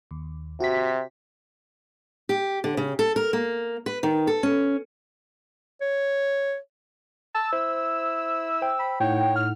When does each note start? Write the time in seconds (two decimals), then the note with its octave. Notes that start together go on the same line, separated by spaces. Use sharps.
0.11 D#2
0.60 C3 F#4 B6
2.29 G4
2.64 D3
2.77 C#3
2.99 A4
3.16 A#4
3.33 A#3
3.86 B4
4.03 D#3
4.27 A4
4.43 C#4
5.81 C#5
7.35 A5 E6
7.52 E4 C5
8.62 C5 G5
8.80 B5
9.00 A2 D#4 C#5 F#5 G5
9.36 F6